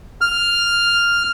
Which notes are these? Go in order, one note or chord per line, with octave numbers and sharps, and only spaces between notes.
F6